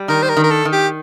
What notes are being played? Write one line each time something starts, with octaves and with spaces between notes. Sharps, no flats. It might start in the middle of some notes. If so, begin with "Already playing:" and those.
Already playing: G3
D#3 A#4
C5
A#4
D#3
A#4
A4
D#3
G4